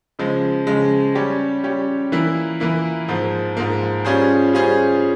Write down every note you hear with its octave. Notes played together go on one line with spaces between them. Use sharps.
C#3 F3 G#3
C#3 F3 G#3
G3 C#4 G4
G3 C#4 G4
E3 A#3 E4
E3 A#3 E4
G#2 F3 A#3
G#2 F3 A#3
G3 C#4 F4 G#4 C5
G3 C#4 F4 G#4 C5